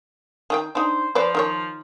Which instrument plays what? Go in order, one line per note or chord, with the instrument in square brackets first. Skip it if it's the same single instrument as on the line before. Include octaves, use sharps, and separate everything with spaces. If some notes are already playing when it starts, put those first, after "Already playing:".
[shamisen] D#3 G#4 G5
[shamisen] D4 D#4 [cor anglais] C5
[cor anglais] F3 [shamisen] B4 C5 D5
[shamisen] D#3 A#4 C#5